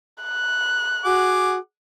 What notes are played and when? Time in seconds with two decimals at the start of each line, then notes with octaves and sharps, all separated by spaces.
0.23 F#6
1.05 F#4 G#4 F#5 D6